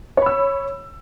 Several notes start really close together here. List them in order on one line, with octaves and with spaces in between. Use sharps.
C#5 B5 E6